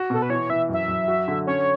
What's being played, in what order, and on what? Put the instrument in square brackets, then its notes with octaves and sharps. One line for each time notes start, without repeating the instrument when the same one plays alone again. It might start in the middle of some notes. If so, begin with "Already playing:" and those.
Already playing: [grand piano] F#4
[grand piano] B2 [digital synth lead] A4
[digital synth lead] B4
[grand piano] E3 [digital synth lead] C#5
[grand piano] E3 [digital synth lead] E5
[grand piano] F#2 [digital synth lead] E5
[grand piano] F#2
F#4
D3
[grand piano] C#4 [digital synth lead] C#5